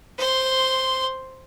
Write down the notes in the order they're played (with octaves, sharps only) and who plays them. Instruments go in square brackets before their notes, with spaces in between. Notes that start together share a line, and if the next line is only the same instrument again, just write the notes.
[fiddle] C5 C6